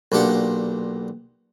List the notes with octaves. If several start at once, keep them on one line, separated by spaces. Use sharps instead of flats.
B1 A#2 D4 G4 F#5